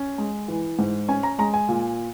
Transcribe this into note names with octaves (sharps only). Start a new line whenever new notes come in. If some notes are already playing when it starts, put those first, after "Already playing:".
Already playing: C#4
G#3
E3
G#2
C#4 G#5
A#5
G#3 A#5
G#5
A#2